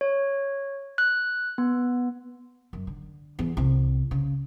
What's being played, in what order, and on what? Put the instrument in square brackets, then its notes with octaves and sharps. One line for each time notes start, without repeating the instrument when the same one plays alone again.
[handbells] C#5
F#6
B3
[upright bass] F#2
D3
E2
C2
C#3